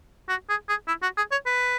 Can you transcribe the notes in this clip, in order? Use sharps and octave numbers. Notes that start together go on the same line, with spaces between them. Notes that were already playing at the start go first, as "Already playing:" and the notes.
F#4
G#4
G#4
E4
F#4
G#4
C#5
B4